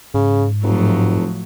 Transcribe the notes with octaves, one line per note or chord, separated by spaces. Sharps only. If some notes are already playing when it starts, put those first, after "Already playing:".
G#2 C#3
F1 A2 F3 F#3